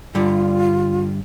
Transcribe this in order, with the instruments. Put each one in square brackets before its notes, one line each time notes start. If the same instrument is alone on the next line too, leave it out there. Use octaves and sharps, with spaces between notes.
[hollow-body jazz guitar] G2 D3 G3 [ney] F4